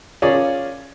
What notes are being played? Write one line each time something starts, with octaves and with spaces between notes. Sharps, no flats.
C#4 F4 G#4 A#4 C#5 D5